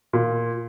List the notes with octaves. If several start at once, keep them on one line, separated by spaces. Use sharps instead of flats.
A#2